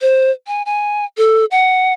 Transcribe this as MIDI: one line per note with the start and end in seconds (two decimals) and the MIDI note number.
0.01 0.31 72
0.47 0.62 80
0.66 1.05 80
1.17 1.45 69
1.51 1.93 78